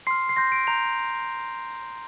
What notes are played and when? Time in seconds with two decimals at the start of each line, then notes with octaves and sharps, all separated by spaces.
0.07 C6 F6 C7
0.29 C7
0.36 C6 G6 A#6
0.52 D7
0.67 A#5 G6 F7